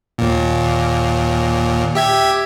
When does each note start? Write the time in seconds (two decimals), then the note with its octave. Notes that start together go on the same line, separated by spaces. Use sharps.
0.18 D#2 A#2
1.95 G4 E5 G#6